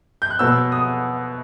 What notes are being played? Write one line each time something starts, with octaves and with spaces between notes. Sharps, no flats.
G6
F#6
B2 F#3 B3 E6
D#6